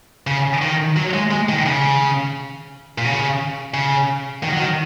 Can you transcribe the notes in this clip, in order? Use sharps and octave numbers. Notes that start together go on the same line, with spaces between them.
C#3
D#3
F#3
G#3
G#3
D#3
C#3
A#2
C#3
C#3
D#3
F#3
D#3